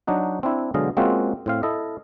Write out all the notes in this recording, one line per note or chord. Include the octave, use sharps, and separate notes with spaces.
F#3 D4 D#4 F#4
C4 D4 E4
B2 D3 F#3 G#3 D#5 F5
G#3 A#3 C4 C#4 F4 F#4
A2 C4 F5
E4 A4 D#5